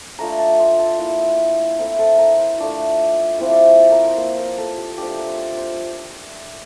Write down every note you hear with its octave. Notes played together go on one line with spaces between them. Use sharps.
A3 D4 F4 A#5
A#5
A5
A#5
C6
A5
A#3 E4
A3 C4 E4 A#4
A4
A#4
C5
A3 D4 F4 D5
F3 C4 E4 E5
D5
C5
C5
A#4
C5
A#3 F4 C5
A#4
A4
G4
F3 A3 D4 G4
G4
A#4
C5
D5
C5